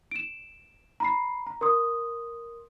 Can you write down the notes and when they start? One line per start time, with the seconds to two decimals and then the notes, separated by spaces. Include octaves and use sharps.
0.11 D7 E7
1.00 A#5 B5 C7
1.46 A#5
1.61 A#4 C6 D#6